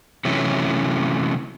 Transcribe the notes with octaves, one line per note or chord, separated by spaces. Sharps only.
C3 E3 F#3 A3 C#4